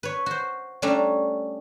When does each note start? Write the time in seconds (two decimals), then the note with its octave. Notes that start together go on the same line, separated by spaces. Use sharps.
0.03 B4 C#5
0.26 F#4 C5
0.82 G3 A3 C#4 D4 E5 A#5